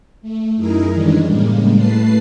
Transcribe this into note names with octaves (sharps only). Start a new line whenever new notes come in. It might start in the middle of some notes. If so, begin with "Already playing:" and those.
A3
F#2 D#4 E4 G#4 A#4
D#3 E3 G3 G#3 C#4 D4
A2 C#3 G3 G#3 A#3
A2 A3 B4 A5 C7